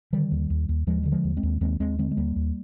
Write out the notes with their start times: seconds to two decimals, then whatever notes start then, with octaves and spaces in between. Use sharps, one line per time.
0.13 D3 D#3 G3
0.32 D#2
0.50 D#2
0.69 D#2
0.87 D#2 F3 G#3
1.03 D3 G3
1.12 F3 G#3
1.24 D#2
1.37 G#3 C4
1.43 D#2
1.61 D#2 G#3 C4
1.80 D#2 G#3 C4
1.98 D3 G#3 C4
2.11 G#3
2.17 D#2 G3 A#3
2.36 D#2